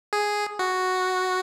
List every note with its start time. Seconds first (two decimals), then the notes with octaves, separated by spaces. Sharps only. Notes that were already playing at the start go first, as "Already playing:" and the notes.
0.13 G#4
0.59 F#4